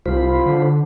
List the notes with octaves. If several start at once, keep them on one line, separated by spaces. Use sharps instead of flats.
C2 F4 C5 B5
D3